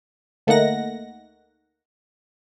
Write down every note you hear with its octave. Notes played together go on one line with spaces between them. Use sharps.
D2 A3 A#3 D#4 F#5 A#6